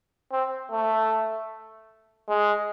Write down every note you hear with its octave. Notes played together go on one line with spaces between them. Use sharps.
C4
A3
G#3